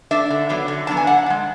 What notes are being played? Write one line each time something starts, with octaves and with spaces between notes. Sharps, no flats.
A3 D4 E5
D3
F#3 B3 D4
D3
F#3 B3 D4 A5
G#5
D3 F#5
G#3 D4